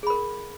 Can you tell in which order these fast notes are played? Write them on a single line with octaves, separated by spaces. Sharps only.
G#4 B5 A#4